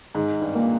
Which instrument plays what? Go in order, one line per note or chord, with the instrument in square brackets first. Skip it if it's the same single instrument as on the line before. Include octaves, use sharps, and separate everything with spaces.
[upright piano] G#2 [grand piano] D#3
[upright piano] G2
[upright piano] A#2 [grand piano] A#3